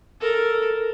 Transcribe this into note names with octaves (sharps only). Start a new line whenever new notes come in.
A4 A#4